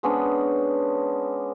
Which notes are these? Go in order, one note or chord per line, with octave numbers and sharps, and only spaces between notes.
G#3 B3 C#4 D4